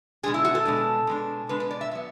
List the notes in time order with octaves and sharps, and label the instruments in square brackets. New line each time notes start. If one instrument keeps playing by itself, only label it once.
[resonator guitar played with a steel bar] B2 G#3 D4 G#4
E4
F#4
A4
B2 G#3 D4
B2 G#3 D4
B2 G#3 D4 B4
B4
D5
E5
F#3 B3 E5